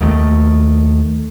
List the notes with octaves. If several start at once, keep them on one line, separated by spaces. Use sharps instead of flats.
D#2 D#3 E3 A3